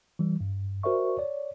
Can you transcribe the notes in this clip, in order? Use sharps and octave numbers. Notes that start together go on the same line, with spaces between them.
E3 G3
G2
F#4 A#4 C5 D5 E5 C#6
C#5 D5